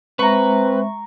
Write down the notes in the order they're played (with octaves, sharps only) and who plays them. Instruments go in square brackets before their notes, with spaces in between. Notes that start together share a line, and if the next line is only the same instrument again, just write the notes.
[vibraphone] G#3 E5 [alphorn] C4 [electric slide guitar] B4 [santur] A#5 C#6